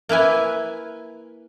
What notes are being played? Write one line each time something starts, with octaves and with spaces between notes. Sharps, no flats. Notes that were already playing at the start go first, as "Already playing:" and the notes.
A#3 E4 B4 G#5